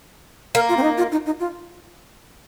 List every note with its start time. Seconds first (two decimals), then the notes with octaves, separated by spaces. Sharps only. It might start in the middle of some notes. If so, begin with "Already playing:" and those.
0.55 A#3 A#4
0.69 F4
0.77 C4
0.83 D#4
0.98 F4
1.12 D#4
1.26 D#4
1.40 F4